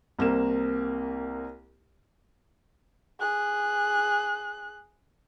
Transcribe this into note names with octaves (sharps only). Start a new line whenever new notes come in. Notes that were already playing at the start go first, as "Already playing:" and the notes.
C2 A#3 C4 E7
G#4 F#6